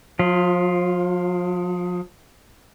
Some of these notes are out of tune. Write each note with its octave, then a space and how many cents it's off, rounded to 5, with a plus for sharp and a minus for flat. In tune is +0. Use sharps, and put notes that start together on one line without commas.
F3 +40 F4 +0